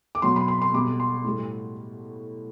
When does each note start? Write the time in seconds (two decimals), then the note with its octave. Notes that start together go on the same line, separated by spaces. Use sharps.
0.15 D6
0.22 B2 F#3 C6
0.36 B5
0.48 C6
0.62 C6
0.74 B2 G3 D6
1.00 C6
1.24 A2 G3